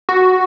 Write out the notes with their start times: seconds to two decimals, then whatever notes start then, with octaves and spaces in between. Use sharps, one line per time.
0.09 F#4